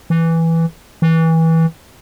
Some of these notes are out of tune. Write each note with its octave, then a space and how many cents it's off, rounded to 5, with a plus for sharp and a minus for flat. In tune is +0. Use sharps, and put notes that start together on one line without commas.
E3 +0
E3 -20